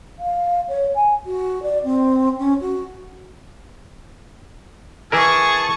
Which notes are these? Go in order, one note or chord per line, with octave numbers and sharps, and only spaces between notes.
F5
C#5
G#5
F#4
D5
C4
C#4
F#4
E3 E4 G#4 A#4 A5 C#6